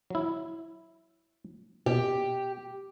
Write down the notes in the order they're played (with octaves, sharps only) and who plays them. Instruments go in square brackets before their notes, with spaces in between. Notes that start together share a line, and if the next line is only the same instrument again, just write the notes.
[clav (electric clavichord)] F#3 E4
[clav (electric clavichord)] B2 [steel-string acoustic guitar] G4